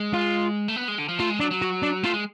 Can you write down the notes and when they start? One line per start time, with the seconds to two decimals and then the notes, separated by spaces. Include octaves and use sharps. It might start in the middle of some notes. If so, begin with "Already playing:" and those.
Already playing: G#3
0.13 F4
0.68 A3
0.76 B3
0.88 G#3
0.98 D3
1.08 F3
1.19 A3 F4
1.30 G#3
1.40 F#3 D4
1.51 F#3
1.62 F#4
1.83 D4
2.03 A3 F4
2.14 G#3